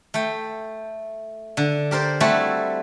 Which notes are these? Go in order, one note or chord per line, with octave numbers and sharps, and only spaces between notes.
A3 G5
D3
G4 A#4 C5 D5
G3 A3 C4 E4 F#4 A4